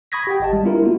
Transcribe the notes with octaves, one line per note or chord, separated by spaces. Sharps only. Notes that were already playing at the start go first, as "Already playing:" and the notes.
B5 C#6 D#6 G#6 A#6 B6
G4 F#5 G5
G#1 D#5 A5
G3 G#3
B3 D4 E4 F4 A#4
G#3 A#3 E4 F#4